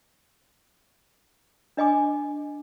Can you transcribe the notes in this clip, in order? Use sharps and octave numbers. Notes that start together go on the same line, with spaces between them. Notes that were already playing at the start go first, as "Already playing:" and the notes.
D4 D#5 G#5 D6